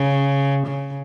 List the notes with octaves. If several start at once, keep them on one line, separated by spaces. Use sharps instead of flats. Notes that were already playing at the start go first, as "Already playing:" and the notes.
Already playing: C#3
C#3